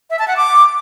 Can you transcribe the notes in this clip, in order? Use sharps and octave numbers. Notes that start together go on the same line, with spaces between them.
E5
A5
F#5
D6